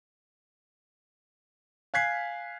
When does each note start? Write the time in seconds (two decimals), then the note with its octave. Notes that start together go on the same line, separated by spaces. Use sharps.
1.94 F5 G#5 F#6 G#6 B6 C7